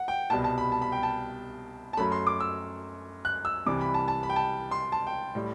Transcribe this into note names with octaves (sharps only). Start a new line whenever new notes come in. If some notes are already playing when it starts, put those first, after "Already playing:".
Already playing: F#5
G5
C2 B2 G3 A5
A5
B5
A5
B5
G5
A5
A5
F#2 F#3 A3 B5
C6
D6
E6
F#6
E6
C2 C3 E3 G3 D6
B5
A5
A5
B5
G5
A5
C6
A5
G5
A2 G3